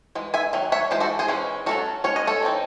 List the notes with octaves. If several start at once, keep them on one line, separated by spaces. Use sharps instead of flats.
E3 G#3
E5 G#5
D#3 F#3
C#5 E5
E3 G#3 C5
F#4 A4
G#4 C5
E3 G#3 C#4
F#3 A3 C#4 F#4 A4
G#3 C#4 C#5
D#5
A4 C#5
E3 C4 D#4